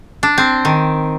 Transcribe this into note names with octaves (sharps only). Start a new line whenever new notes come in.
D4
C4
D#3